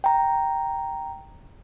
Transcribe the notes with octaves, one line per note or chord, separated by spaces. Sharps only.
G5 A#5